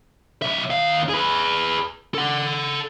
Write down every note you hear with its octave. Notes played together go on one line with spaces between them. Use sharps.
B1 E5
D#2 F5
G#4 B4
A4 F#5